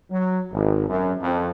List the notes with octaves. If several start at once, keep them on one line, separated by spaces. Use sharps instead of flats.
F#3
G#1
F#2
F2